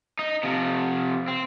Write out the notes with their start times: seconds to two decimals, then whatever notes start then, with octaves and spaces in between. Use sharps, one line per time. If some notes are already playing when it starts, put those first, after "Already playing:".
0.19 D#4
0.43 C3 F3
1.28 C4